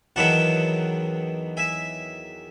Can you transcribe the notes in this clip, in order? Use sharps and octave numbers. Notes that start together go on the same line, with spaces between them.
E2 D#3 F#3 B3 E4 F#5 A5
E5 G#5